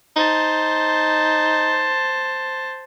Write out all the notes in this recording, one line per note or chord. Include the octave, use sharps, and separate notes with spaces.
D#4 C5 A5